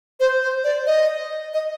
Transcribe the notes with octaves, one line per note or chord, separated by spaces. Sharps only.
C5
C5
D5
D#5
D#5